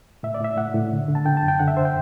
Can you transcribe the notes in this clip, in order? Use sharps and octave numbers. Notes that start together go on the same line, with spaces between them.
A2 E5
D5
A2 E5
A2 F#5
A2
D3
D3
A5
D3 G5
A5
F#2
G5
D3 F#5
E5
C5
G5